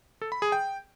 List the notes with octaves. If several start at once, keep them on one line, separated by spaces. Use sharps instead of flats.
A4
B5
G#4
G5